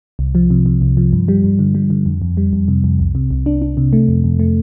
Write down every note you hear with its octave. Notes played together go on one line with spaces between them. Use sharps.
C2
F3
C3
C3
C2
F3
G2
G3
G2
D3
G3
D3
F2
F2
G3
F2
C3
F2
C2
C3
C2
D4
D4
C3
A3
F2
F2
A3